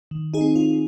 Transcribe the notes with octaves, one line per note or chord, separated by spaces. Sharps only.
D#3
D#4 G#4
C4
F4